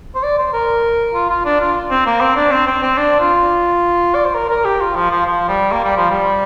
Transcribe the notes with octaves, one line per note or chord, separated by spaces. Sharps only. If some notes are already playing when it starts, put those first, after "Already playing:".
C5
D5
C5
A#4
F4
F4
D4
F4
C4
A#3
C4
D4
C4
C4
C4
D4
F4
D5
C5
A#4
A#4
G4
F4
F3
F3
F3
G3
A#3
G3
F3
G3